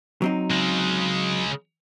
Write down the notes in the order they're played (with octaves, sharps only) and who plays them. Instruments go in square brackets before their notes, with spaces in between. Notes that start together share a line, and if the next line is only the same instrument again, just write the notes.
[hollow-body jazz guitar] F#3 C4 D#4
[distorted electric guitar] C#3 G#3